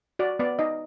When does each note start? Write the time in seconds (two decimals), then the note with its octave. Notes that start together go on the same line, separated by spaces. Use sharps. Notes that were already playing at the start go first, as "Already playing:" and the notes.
0.19 F#4 D5
0.39 B3 D5
0.59 D#4 D#5